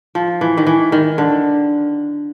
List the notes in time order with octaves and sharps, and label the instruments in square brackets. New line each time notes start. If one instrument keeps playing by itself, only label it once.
[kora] F3
E3
D#3
E3
D#3
D3